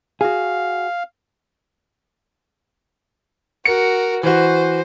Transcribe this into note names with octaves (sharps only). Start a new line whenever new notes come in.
F#4 G#4 F5
F#4 A#4 C#7
E3 F#4 C5